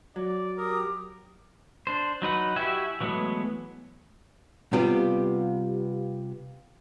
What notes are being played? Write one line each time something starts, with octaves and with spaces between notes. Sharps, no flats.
F#3 D5
G4 A#4 D6 D#6
D4 C5
F#3 D#4 B4 F#5
E4 F#4 G4 E5 G#5
E3 F#3 G#3 A3 B3
C3 G3 B3 F4 G4